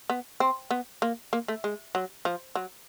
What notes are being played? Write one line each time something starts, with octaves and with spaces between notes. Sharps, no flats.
B3
C4
B3
A#3
A#3
A3
G#3
F#3
F3
F#3